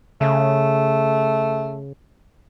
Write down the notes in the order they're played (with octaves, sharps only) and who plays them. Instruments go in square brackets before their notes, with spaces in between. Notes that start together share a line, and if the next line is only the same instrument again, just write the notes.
[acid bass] C#3 [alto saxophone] A3